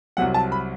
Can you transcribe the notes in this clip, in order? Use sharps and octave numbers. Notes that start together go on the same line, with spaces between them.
C2 C3 F#3 F#5
A5
B5